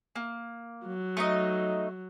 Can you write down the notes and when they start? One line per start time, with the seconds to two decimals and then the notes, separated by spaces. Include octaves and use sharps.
0.16 A#3
0.86 F#3
1.17 A3 D#4 D#5